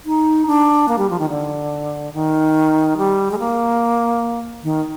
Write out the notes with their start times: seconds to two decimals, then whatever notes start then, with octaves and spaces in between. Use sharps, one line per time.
0.05 D#4
0.47 D4
0.88 A#3
0.98 G3
1.10 F3
1.19 D#3
1.30 D3
2.14 D#3
2.97 G3
3.31 G#3
3.39 A#3
4.63 D#3